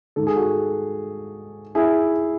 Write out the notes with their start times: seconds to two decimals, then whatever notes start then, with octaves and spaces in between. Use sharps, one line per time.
0.16 G#2 D#3 A4
0.27 G#4
0.36 F#4 A4
1.75 E4 G#4